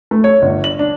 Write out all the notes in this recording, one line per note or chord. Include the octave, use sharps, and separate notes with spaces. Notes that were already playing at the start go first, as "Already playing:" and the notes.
A3
C#5
G1
F#7
D4